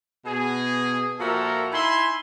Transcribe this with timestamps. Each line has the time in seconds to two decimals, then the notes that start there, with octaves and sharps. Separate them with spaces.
0.25 B2 G#4
1.20 A#2 F3 F#4 A4 A#4 E5
1.72 D#4 E4 E5 G#5 B5 C6